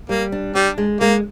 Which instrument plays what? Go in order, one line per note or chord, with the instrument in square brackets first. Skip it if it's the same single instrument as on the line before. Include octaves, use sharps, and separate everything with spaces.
[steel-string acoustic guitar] G3 [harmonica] A#3
[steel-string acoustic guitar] D4
[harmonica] G3 [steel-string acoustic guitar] D4
[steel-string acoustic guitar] G#3
[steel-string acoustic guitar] G#3 [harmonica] A#3